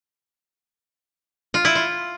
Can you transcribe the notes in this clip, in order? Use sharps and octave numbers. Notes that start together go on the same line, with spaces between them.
F4
E4
F4